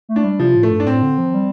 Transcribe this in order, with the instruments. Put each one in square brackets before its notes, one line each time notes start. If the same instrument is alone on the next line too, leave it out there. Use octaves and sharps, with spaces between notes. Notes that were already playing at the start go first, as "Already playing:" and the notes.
[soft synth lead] A3
[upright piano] D4
[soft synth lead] G3
[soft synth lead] C3 [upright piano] F3
[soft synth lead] A2
[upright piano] A3
[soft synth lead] G2
[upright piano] D4
[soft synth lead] A2 [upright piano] C4
[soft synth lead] D3
F3
G3